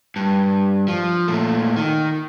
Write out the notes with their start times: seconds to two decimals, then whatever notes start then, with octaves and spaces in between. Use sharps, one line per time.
0.16 G2
0.88 F3
1.28 A#2 A3
1.76 D#3